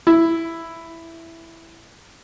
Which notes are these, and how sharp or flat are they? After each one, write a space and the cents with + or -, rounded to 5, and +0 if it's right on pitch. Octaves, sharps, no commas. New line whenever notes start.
E4 +5